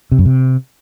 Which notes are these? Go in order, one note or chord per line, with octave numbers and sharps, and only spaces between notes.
C3
F#2
C3